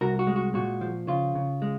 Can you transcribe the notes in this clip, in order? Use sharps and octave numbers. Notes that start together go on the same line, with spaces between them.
C2 F#4 A#4
F#4
G#3
F#4
A#2 F#4
F3
C#3 F4
C#3
G#3